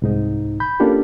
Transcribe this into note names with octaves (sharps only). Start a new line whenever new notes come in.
C2 G#2 D#4
B5 G6
A#3 C#4 D4 F4 G4 A4